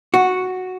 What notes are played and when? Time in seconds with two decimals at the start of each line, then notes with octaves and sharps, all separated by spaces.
0.14 F#4